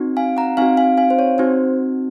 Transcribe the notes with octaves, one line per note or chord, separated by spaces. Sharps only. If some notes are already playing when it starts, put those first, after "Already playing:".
Already playing: C4 D#4 F#4
F5 G#5
F#5 A#5
C4 D#4 F#4 F5 G#5
F5 G#5
F5 G#5
C5
C#5
C4 D#4 F#4 C5